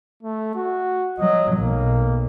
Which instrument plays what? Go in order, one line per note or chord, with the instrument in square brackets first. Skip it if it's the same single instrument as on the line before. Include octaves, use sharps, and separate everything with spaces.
[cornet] A3
F#4
[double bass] F#3 [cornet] D#5
[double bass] B1 [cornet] A#3